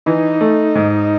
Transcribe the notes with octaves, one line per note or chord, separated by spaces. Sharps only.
E3 D#4
A3
G#2